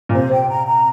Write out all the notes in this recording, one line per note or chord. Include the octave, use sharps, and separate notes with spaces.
A#2
C3 C5
G5
A#5
A#5